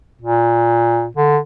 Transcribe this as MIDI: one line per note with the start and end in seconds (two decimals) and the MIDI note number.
0.21 1.07 46
1.17 1.38 50